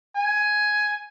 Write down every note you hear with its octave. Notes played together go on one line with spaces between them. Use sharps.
G#5